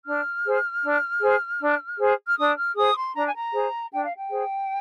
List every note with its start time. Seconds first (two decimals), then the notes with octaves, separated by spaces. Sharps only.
0.05 D4 F6
0.44 G#4 C5
0.83 D4
1.21 G#4 C5
1.60 D4
1.99 G#4 C5
2.26 F6
2.38 D4 D#6
2.57 F6
2.76 G#4 C5 D#6
2.95 C6
3.15 D4 A#5
3.25 G#5
3.36 A#5
3.53 G#4 C5
3.92 D4 G5
4.04 F5
4.16 G5
4.30 G#4 C5